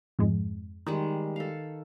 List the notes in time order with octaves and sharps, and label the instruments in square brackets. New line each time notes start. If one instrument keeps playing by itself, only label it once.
[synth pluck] F2 G#2 G#3
[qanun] D#3 G3 G#3 [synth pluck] D#4
[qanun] A4 F5